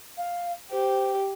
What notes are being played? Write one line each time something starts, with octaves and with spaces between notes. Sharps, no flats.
F5
G4 C5